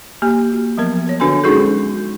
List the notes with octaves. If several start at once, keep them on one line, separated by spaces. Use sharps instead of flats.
A#3 G4
F#4
F3 F#3 B3 A#4
A#4 C#5
D3 D4 F#4 A4 G#5 C6
G#3 C#4 D#4 F#4 G#4 A4